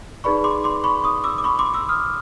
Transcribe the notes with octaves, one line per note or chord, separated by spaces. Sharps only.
D#4 G#4 B4 D5 B5 C#6
C6 D6
C6 D6
B5 C#6
C#6 D#6
D6 E6
D6
B5 C#6
C6 D6
D6 E6
D#6 F6